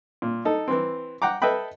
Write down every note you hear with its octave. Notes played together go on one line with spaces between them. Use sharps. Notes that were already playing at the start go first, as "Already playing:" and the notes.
A#2
D#4 A4
E3 C4
F#5 G5 A#5 D6
A4 B4 D#5 E5 G5 B5